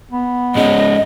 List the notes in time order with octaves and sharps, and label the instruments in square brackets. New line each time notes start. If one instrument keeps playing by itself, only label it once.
[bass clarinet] B3
[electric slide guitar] G#2 G#3 C#4 [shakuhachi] D#5